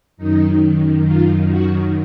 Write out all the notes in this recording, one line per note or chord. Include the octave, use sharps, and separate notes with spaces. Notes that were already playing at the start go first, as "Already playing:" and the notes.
F#2 D#3 D#4
F4
F#4